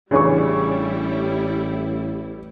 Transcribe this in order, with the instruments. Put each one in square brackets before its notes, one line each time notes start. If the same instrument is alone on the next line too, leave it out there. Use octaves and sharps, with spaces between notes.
[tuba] A1 [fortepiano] C#3 E3 [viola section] G3 E4 [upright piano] D4 C#5 C#6